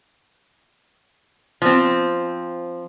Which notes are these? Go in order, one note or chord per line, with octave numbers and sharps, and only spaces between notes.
F3 C4